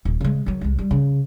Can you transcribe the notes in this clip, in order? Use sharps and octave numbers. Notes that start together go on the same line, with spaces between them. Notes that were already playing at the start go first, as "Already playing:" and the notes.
D#1
C#3 G#3
D#3 F#3
C2 G#3
G3
C#3